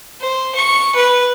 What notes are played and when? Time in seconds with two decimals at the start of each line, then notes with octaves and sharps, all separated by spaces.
0.20 C5
0.55 C#6
0.95 B4